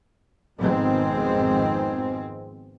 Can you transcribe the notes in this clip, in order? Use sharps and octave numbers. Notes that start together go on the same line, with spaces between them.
G#1 F2 G#2 B2 G#3 C4